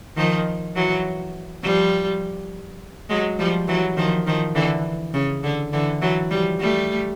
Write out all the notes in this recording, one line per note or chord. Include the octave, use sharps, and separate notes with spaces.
D#3 F3
E3 F#3
F3 G3
F#3 G#3
F3 G3
E3 F#3
D#3 F3
D#3 F3
D3 E3
C#3
D3
D3 E3
E3 F#3
F3 G3
G3 A3